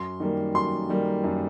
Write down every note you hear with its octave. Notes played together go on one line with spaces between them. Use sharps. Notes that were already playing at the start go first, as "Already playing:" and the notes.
Already playing: F#2 C6
D#3 G3 A#3
F#2 C6
D#3 G3 A#3
F#2